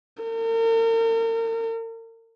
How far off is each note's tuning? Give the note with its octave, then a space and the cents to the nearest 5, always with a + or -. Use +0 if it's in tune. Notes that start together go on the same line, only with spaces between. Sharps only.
A#4 -40